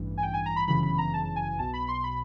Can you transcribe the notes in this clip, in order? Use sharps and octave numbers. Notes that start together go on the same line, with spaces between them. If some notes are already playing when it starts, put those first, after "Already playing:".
Already playing: A1 G2 E3
G#5
G5
G#5
A#5
B5
G1 F#2 C#3 E3 B5
B5
A#5
A5
G#5
B1 B2 A5
B5
C6
B5